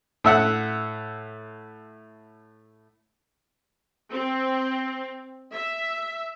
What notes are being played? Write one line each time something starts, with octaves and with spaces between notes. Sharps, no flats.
A2 E5 F#5 F#6
C4
E5